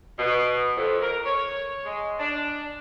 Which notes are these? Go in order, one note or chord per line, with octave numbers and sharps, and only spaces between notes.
B2
F2
A#4
C#5
G#3
D4